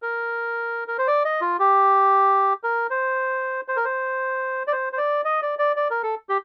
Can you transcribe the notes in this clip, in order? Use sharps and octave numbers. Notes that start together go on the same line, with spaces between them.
A#4
A#4
C5
D5
D#5
F4
G4
A#4
C5
C5
A#4
C5
D5
C5
C5
D5
D#5
D5
D5
D5
A#4
A4
G4